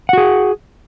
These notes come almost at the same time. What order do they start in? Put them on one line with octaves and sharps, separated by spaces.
F#5 F#4 G#4